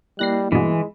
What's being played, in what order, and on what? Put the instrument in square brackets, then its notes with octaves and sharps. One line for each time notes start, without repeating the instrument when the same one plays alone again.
[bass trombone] G3 [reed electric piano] A#3 E4 D#5 [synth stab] F#6 A#6 C7
[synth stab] G2 B2 [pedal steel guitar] E3 [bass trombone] G#3